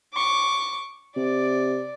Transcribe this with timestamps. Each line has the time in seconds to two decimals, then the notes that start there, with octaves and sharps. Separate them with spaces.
0.14 C#6 D6
1.17 C3 D5